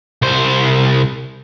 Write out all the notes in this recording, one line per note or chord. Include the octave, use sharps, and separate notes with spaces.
C2 C5